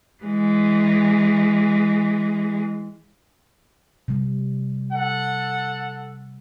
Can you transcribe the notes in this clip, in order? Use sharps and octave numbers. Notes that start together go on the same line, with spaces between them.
E3 G#3
C3 G3
A4 F#5